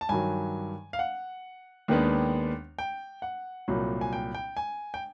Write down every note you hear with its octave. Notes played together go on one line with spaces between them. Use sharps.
A5
G2 D#3 F#3 G#5
F5
F#5
D#2 D#3 G#3 B3 D4
G5
F#5
C2 A#2 F#3
G#5
G5
G5
G#5
G5